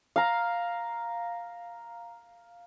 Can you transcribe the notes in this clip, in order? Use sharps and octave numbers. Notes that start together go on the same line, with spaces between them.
F5 A#5